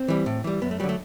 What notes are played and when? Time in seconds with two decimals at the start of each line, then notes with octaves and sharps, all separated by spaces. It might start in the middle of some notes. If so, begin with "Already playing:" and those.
Already playing: C4
0.08 E3 G3
0.26 A2
0.44 E3 G3
0.62 F#2 B3
0.71 A3
0.80 D3 F#3 G3
0.89 A3